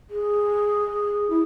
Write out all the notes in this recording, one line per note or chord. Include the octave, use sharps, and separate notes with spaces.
G#4
E4